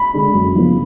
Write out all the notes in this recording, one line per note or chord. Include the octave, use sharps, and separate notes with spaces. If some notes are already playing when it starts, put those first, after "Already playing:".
Already playing: B5
D3 G#3 D4
F#2
C#3 F3 B3